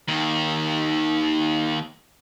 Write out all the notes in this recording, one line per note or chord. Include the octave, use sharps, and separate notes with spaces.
D#2 D#3